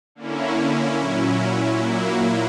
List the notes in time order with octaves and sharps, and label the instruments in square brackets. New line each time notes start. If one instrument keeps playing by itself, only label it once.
[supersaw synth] D3 A#3 C#4 E4
A#2 F#3 C#4 E4
A#2 F#3 A#3 E4